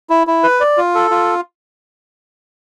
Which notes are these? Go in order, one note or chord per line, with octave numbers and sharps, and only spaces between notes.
E4
E4
B4
D5
F4
A4
F4